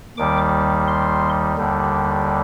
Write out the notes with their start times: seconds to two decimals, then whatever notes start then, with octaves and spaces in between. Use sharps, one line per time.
0.17 D#2 D#3 G3 D6
0.88 C6
1.57 D#2 D3 G3